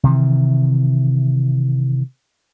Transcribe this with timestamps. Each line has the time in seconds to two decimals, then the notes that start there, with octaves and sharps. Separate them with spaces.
0.04 C3 D#3 E3